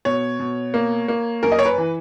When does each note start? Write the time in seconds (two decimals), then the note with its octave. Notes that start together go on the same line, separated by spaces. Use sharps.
0.05 B2 C#5
0.40 B2
0.74 A#3
1.08 A#3
1.43 F#2 A#4
1.52 D#5
1.59 C#5
1.66 B4
1.78 E3